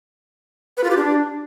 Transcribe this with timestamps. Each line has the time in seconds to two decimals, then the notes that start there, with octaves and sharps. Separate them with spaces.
0.77 B4
0.84 F4
0.90 G4
0.97 D4